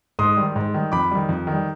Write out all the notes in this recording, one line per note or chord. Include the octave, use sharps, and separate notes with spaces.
G#2 C6 D#6
D#3 G3
G#2
D#3 G3
F2 B5 D6
D#3 G3
F2
D#3
G3